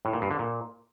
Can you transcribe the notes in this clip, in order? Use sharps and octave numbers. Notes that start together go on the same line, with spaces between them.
A2
A#2
G2
D3
A#2